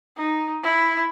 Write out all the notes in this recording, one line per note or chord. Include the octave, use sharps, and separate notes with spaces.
D#4
E4